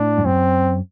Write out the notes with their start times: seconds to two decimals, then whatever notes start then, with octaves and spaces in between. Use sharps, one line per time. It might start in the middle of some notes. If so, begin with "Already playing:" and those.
Already playing: A2 D4
0.18 G2
0.24 F#2 C4